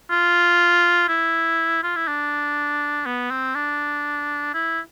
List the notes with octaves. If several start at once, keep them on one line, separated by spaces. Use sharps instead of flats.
F4
E4
F4
E4
D4
B3
C4
D4
E4